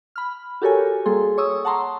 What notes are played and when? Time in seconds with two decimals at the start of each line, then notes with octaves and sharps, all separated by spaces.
0.16 B5 F6
0.62 F#4 G4 A4 A#4 C#5 G#5
1.05 G3 A#3 G#4 A4 C6
1.38 C#5 C#6 D#6 E6
1.65 F#5 A5 A#5 C6